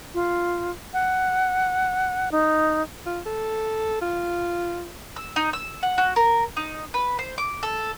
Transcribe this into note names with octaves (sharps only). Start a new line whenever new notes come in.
F4
F#5
D#4
F4
A4
F4
E6
D#4
E6
F#5
F#4
A#4
D#4
B4
C5
D6
A4